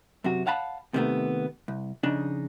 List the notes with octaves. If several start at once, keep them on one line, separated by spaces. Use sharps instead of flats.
F#2 C3 F#4
C#5 F5 F#5 A5 B5
D#2 C3 D#3 G3 A3 B3
C2
F2 C#3 D4 D#4